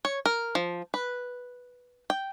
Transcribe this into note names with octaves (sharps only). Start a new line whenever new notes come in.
C#5
A#4
F3
B4
G5